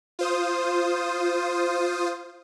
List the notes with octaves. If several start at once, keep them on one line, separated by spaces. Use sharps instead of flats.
F4 C5 D#6